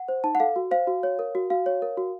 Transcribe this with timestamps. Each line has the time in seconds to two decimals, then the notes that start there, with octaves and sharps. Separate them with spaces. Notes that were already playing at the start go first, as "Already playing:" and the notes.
Already playing: F#5
0.08 C5
0.24 D#4 A5
0.35 F#5
0.40 A4 F5
0.56 F#4
0.71 C5 F5
0.87 F#4
1.03 C#5
1.19 A#4
1.35 F#4
1.50 F#4 F5
1.66 C#5
1.82 A#4
1.97 F#4